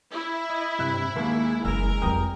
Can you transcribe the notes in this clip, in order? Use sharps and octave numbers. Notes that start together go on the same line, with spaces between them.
E4
D#5
G2 C3 E5 E6 F#6
D#2 G#3 A#3
F#1 A#4 E6
F2 G3 G5 A#5 D#6